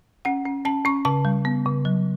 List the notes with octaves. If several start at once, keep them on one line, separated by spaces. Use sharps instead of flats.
C#4 F#5
C#4
C#4 A5
C#4 C#6
C#3 A5
G3
B3
C#3
F#3